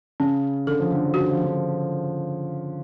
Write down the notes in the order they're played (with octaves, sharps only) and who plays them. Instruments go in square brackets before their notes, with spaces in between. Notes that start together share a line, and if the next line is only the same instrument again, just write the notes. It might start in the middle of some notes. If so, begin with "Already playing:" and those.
[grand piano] C#3 [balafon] C#4
[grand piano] D3 [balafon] A4
[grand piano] F3
D3
F3
[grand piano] D3 [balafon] F#4
[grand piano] F3
D3